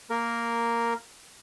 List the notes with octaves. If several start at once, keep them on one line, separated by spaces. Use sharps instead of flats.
A#3 A#4